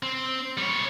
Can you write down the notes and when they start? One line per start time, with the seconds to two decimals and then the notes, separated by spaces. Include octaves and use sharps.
0.03 C4
0.57 G3 C#5